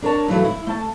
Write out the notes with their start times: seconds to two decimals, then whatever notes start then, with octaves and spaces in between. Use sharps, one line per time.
0.02 D4 A#4 C#5 A5
0.28 G2 E3 F#3 A3
0.45 E4
0.67 A3 A5